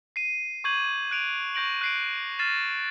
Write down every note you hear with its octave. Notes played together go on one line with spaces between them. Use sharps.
C7 D#7
C#6 D6 G6 G#6 D#7 F#7
F#6 G#6 D7 D#7 F7
C#6 G6 A#6 D7 F#7
F#6 C7 D7
F6 A6 A#6 C7 D#7 E7